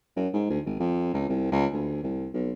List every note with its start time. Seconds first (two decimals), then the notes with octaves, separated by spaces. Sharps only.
0.16 F#2
0.33 G#2
0.50 D2
0.66 G#1
0.79 F2
1.14 C#2
1.29 C2
1.51 C#2
1.73 D2
2.03 C2
2.34 B1